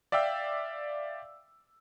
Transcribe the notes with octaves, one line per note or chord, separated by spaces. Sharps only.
D5 E5 F5 G5 E6